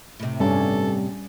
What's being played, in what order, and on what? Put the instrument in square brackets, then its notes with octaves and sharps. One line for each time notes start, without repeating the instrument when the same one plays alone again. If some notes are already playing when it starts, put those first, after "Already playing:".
[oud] A2 C3
[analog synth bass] G2 [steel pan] G3 C#4 [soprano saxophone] A4